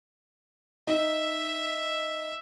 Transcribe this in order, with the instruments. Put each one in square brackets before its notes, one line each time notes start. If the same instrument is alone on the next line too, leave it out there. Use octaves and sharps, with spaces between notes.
[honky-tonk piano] D#4 [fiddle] E5